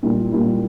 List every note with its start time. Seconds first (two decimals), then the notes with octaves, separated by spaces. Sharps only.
0.03 A#2 G3 A#3 E4
0.32 A#2 G3 A#3 E4